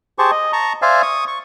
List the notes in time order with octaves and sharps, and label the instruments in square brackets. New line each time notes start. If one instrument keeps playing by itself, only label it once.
[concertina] G4 G#4 C5 A5 C#6
D#5
A5 A#5 C#6
C5 D5 E5 F5 G#5
C#6 D#6
C#6